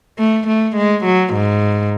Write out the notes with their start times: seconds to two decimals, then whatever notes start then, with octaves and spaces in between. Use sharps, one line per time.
0.19 A3
0.47 A3
0.76 G#3
1.04 F#3
1.34 G#2